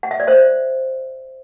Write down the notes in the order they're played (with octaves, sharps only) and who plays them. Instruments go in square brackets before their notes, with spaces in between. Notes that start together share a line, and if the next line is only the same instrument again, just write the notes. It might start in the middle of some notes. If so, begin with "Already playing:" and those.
[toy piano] F#5
E5
D5
C5 E5